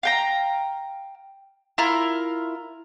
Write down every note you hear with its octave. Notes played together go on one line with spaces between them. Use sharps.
F5 G5 A#5
E4 F4 A#4